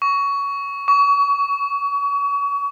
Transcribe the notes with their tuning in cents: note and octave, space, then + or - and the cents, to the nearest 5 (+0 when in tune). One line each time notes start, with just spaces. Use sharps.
C#6 +20
C#6 +35